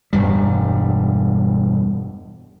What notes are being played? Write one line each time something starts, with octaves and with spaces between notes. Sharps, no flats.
E1 G2 G3